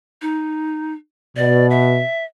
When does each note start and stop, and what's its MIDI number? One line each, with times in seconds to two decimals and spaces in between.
0.22 0.92 63
1.36 2.00 47
1.36 1.69 74
1.70 2.24 76